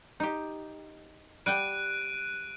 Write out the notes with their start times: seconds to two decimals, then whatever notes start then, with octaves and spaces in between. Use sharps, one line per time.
0.20 D#4 G4
1.46 G3 F#5 G5 F#6 D7 D#7